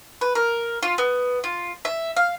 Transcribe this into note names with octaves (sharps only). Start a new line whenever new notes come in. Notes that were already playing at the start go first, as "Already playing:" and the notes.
B4
A#4
F4
B3
F4
E5
F5